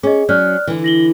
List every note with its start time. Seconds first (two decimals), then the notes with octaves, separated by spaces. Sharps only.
0.03 C#4 G#4 D#5
0.29 F#3 C#4 D5 F6 F#6
0.67 D3 E3
0.84 A#6 F#7 G7